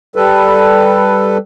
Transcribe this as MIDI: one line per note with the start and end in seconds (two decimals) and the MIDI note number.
0.16 1.37 55
0.16 1.37 69
0.16 1.37 71